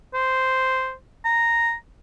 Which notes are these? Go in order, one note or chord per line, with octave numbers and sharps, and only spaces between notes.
C5
A#5